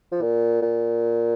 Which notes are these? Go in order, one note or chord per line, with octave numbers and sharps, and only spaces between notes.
F3
A#2
A#2